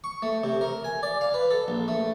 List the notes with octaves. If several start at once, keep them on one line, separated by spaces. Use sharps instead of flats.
C#6
A3
C3
A#4
G#5
D5
F5
B4
A4
A#1
A3